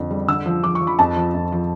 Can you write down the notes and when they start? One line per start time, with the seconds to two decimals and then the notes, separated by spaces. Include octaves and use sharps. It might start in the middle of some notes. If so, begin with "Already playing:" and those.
Already playing: F2 D3
0.11 G3
0.28 D3 E6
0.46 F3
0.63 F3 D6
0.75 C#6
0.82 F3
0.87 B5
0.99 F2 A5
1.16 F3
1.34 F2
1.52 F3